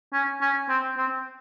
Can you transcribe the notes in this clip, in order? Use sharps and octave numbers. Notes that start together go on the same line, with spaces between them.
C#4
C#4
C4
C4